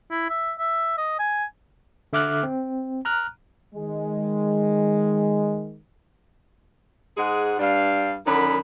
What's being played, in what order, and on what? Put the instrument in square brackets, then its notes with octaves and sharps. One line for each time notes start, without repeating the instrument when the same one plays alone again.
[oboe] E4
E5
E5
D#5
G#5
[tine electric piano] D3 E5 D6 F6 F#6
C4
A#5 F6 F#6
[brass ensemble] D#3 G#3
[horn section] G#2 G#3 G#4 F#5
G2 G3 D4 F5
F#2 D3 D#3 B5